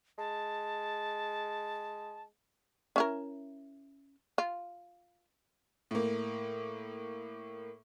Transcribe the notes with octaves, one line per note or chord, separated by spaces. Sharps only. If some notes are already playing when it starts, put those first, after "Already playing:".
G#3 A5
C#4 E4 A#4
F4
A2 A#3